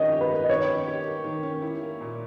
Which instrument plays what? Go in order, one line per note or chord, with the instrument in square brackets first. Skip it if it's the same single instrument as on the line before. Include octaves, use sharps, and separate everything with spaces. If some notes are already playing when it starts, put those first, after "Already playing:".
Already playing: [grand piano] D#3 A#3 C#4 G4 [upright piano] D#5
[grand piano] G4
[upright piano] B4
[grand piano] A#3
[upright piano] D#5
[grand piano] D#3 [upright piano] C#5
[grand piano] C#4
G4
A#3
D#3
C#4
E4
A#3
A#2